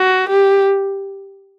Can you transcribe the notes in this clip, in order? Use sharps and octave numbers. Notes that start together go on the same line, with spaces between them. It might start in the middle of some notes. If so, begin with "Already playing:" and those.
Already playing: F#4
G4